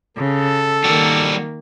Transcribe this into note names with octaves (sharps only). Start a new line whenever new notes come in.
C#3 A4
D#3 G3 A#3 F#4